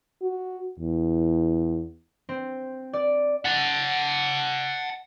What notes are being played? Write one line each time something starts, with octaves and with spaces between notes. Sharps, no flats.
F#4
E2
C4
D5
F#5 A5